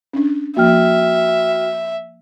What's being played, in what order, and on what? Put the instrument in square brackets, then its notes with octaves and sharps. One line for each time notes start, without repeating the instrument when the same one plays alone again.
[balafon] C#4 D4
[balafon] F3 A#3 [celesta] F#4 G5 F6 [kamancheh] E5